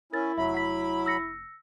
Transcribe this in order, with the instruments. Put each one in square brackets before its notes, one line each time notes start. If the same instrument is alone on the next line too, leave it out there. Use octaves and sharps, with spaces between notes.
[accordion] C#4 [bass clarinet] E4 [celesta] A#4 A6
[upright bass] F1 D4 [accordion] F#3 B5 [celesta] E5
[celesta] F#5 B6
E6 A#6 C#7